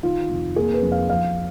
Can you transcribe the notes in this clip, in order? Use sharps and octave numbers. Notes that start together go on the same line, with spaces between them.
D#3 F4
F1
A#3 G#4
B4
F2
F5
F3 F5